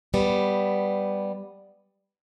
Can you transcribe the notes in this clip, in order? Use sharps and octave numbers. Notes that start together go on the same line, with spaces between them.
G3 B3